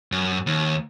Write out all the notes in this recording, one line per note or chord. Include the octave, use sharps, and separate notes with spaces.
F#2
D#2